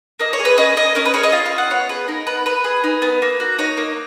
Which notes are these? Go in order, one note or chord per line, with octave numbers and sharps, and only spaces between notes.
A#3 D#5
C#5
G#4
B4
C#4 D#5
A#3 D#5
C#4 A#4
B4
G#4 C#5
D#5
F4 F5
F5
C#4
F#5
B3 C#5
G#4 B4
D#4 A#4
B3 B4
B3 B4
G#4
D#4
B3
A#3
F#4
D#4 C#5
A#3